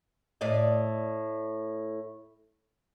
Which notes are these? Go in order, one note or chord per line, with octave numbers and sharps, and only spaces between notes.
A2 D5 D#5